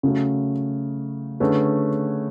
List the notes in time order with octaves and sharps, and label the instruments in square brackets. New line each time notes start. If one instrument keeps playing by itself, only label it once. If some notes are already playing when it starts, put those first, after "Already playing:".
[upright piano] C#3 F#3 A3
D3 A3 C#4 G#4 B4